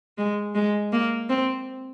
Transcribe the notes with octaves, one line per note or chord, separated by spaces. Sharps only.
G#3
G#3
A#3
C4